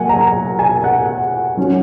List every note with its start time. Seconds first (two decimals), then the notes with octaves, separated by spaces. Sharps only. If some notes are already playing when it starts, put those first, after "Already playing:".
Already playing: F#3 A#3 F#5 G#5
0.09 A#5
0.59 G#5
0.84 F#5
1.57 F#3 C#4